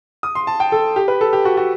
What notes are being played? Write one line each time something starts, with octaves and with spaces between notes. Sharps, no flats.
D#6
C6
A5
G5
A4
G4
B4
A4
G4
F#4
F#4